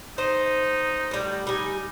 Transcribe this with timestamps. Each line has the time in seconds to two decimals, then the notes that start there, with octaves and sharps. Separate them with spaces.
0.18 D#4 C5 D#5
1.11 A2 G3
1.47 G3 D#4 G#5